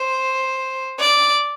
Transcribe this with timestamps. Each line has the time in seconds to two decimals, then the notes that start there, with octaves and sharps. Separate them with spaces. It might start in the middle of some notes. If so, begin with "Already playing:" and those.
Already playing: C5
1.00 D5